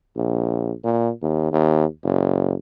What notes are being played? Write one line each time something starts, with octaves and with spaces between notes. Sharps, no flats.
A#1
A#2
D#2
D#2
F#1